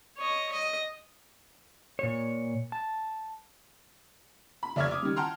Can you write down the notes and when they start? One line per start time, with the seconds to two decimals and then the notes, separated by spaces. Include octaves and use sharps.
0.17 C#5 D#5
0.52 D#5
1.99 A#2 C#5
2.72 A5
4.63 B5
4.76 F1 D5 E5 C#6 F6 G#6
4.91 D6 D#6
5.03 D#3 G3
5.16 F#5 G5 A5 A#5 C6 F6